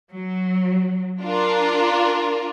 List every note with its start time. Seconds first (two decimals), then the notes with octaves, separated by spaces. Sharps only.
0.11 F#3
1.22 D4 F4 A#4